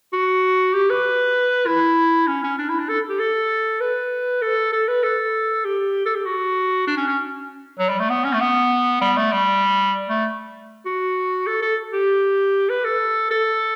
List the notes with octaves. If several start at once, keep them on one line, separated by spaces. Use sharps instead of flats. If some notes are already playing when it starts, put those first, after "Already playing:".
F#4
G4
B4
E4
C#4
C#4
D4
E4
D4
A4
G4
A4
B4
A4
A4
B4
A4
G4
A4
G4
F#4
D4
C#4
C#4
F#3
G3
A3
B3
C#4
A3
B3
G3
A3
G3
A3
F#4
A4
A4
G4
B4
A4
A4